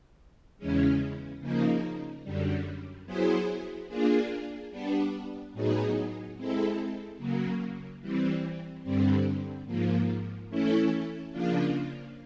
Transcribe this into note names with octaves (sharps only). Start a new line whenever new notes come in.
E2 C#3 E3 G#3 C#4
C#3 F3 A#3 D#4
F#2 D3 G3
F#3 B3 E4 G#4 C5
A#3 D4 F4 G#4
G3 B3 D4
A2 F#3 B3 D#4 G#4
G#3 C4 E4 A4
C#3 F#3 A#3
E3 G3 C4
G2 D3 G3 C4
G#2 F3 A#3
E3 A3 C#4 E4 A4
C#3 F3 A#3 D4 F4